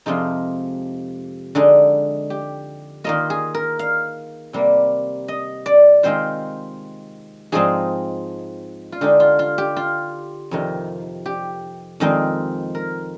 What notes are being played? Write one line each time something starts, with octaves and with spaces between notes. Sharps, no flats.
F2 C3 F3 G#3 D#4 F4
D3 G#3 D#4
G4
D#3 A#3 F4 D#5
G#4
A#4
F5
C3 G3 A#3
D#5
D5
D#3 G#3 C4 F4 C5
G#2 F3 G#3 C4 D#4 G#4
F4
D3 G#3 D#4 G4
F4
F4
G4
F4
F2 C3 D#3
G4
F2 D#3 G#3 C4 D#4
A#4